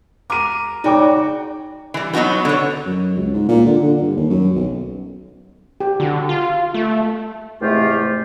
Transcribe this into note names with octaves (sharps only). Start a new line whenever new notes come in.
A#4 D6 D#7
C#3 D#4 F#4 D5 G5 D6
E3 G3
F#3 B3 D#4 F#4 B4
D3 C#5
F#2
C#2
G#2
A#2
D3
D3
G2
D#2
F#2
B1
G4
D3 F#4
F4
A3
E2 G#2 C3 A3 F4 G4